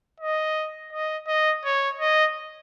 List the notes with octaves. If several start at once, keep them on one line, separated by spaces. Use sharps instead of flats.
D#5
D#5
D#5
C#5
D#5